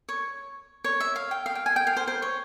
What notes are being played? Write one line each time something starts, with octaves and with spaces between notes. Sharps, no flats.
C#5
C#5
E5
F5
G5
F5
G5
G#5
G5
F5
C5
C5
C#5